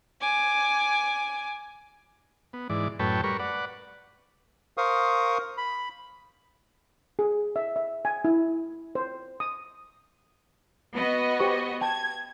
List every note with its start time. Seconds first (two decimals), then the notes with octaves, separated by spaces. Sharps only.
0.21 G#5 D6
2.53 B3
2.70 G#2 E3 D5
2.99 F#2 A2 B4 C#5 G5 A5
3.24 G3 A#4 B4 C#6
3.39 B4 D5 F#5
4.78 A#4 C5 F5 C#6 D#6
5.57 B5
7.19 G#4
7.56 E5
7.76 E5
8.05 G#5
8.25 E4
8.95 C5
9.40 D#6
10.95 B3 F#4 D#5
11.40 G4 C5 C#6
11.81 G5 A5 G#6